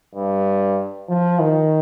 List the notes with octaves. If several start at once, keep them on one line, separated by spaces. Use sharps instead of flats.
G2
F3
D#3